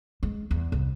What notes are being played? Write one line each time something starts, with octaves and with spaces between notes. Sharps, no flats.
G#3
E2
C2